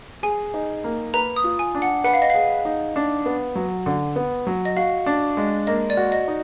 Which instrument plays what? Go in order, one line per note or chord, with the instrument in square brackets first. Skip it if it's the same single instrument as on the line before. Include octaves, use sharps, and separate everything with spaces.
[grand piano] G#4 [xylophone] G#5
[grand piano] D#4
A#3
[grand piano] B4 [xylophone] A#5
[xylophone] D#6
[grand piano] F4
[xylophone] G#5
[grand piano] D4
[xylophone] F#5
[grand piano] B4 [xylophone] F#5
[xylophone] F5
D#5
[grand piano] G#4 [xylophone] F5
[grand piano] D#4
D4
B3
F#3
D3
B3
F#3
[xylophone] D#5
[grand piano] F#4 [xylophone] F5
[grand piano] D4
G#3
[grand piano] A#3 [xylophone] D#5
[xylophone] D5
[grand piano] F#4
[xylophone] D#5
[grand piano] D#4